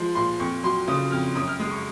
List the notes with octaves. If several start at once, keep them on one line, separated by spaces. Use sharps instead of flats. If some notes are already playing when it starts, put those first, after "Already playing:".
Already playing: F3 G#3 C6
A#2 C6
F2 C#6
F#3 C6
C#3 D#6
F2 F6
F#2 D#6
F6
G#3 D#6
C#6